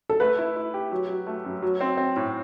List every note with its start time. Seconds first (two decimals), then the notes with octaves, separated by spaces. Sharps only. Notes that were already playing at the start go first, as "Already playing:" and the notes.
0.09 A4
0.20 A3 B4
0.39 E4
0.56 E4
0.74 G4
0.92 F#3
1.09 F#3
1.27 A3
1.45 F#2
1.62 F#3
1.81 C4
1.97 C4
2.16 A2